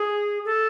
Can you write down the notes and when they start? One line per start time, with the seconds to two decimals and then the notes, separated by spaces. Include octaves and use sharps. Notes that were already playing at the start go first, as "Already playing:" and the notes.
Already playing: G#4
0.45 A4